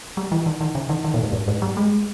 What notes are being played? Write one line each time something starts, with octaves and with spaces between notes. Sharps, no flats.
G3
E3
D#3
D#3
C#3
D#3
D#3
A#2
G#2
G2
G#2
G3
G#3